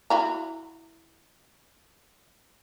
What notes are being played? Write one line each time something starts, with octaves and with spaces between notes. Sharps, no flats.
E4 F#4 A#5